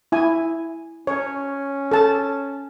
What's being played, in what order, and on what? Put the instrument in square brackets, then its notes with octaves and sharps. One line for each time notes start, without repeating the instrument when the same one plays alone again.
[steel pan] E4 G#5
[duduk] C#4 [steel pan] C#5
[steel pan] A4 A5